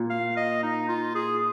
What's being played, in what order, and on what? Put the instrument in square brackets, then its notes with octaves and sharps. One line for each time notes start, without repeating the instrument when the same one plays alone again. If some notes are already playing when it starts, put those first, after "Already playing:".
Already playing: [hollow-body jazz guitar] A#2
[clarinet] F5
D#5
D#4
F4
G#4